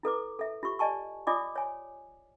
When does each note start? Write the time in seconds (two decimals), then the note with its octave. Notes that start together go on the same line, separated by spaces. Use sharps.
0.03 E4 A4 B4 D6
0.39 A4 E5
0.63 F4 G4 C#6
0.79 D5 D#5 G#5 A5 C#6
1.27 F4 D5 D#5 G#5 D6 D#6
1.56 C#5 G#5